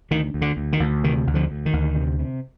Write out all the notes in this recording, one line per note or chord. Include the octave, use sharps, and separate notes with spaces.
D2 D#3
D2
D3
D2
D#3
D2
C3 D#3
D2
D3 F3
D2
D#3
D2
C3
C3